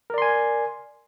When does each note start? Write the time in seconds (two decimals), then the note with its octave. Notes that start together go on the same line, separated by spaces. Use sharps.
0.10 A#4
0.14 D5
0.18 C6
0.22 G#5